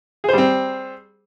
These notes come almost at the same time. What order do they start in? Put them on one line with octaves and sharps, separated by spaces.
G#4 C5 G3 C4